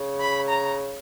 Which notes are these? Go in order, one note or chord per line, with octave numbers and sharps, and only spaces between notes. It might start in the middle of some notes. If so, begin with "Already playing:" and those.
Already playing: C#3
B5
A#5